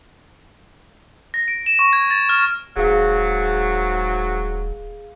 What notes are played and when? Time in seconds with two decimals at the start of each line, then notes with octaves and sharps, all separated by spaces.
1.34 A#6
1.48 D7
1.66 E7
1.79 C#6
1.93 G#6
2.10 A6
2.29 F6
2.77 D#1 G#2 F#3 G#4 F5